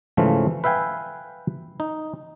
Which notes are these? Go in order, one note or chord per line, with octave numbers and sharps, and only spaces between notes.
G#2 C#3 E3 F3 A3 F4
B4 E5 F5 G5 G#5
D#4